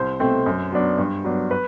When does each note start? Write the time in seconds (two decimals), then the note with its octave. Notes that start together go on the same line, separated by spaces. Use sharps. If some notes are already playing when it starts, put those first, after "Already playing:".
Already playing: C2 C5
0.19 B2 A3 C4
0.46 F#2
0.72 F#3 B3 D4
0.98 G2
1.24 F#3 B3 D4
1.51 B4